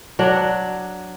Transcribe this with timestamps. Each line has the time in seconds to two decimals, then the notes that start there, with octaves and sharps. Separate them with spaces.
0.19 F#3 D4 F#5